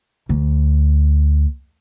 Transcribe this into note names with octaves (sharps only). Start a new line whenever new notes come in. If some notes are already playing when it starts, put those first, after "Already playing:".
D2